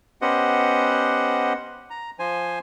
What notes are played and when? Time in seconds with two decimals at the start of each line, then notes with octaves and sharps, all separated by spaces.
0.22 B3 C#4 G4 C5 D#5 F#5
1.90 A#5
2.19 F3 C5 G#5